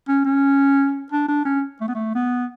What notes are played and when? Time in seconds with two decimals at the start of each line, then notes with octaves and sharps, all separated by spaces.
0.08 C#4
0.25 C#4
1.12 D4
1.28 D4
1.45 C#4
1.81 A3
1.88 B3
1.95 A3
2.15 B3